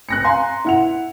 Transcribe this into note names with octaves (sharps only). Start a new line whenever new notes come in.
F#6 A#6 C#7
F5 G#5 A#5 C6
E4 F#5 F7